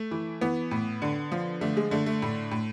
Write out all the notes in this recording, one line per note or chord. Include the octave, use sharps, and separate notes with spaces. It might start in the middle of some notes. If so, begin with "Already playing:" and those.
Already playing: A3
E3
E3 B3
A2
D3
F3
D3 A3
G#3
D3 A3
A3
A2
A2